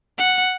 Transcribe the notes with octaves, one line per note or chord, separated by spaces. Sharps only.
F#5